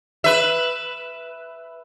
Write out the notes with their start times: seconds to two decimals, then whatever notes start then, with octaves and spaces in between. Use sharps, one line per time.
0.24 B4 E5